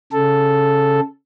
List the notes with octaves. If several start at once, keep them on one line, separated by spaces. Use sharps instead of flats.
C#3 A4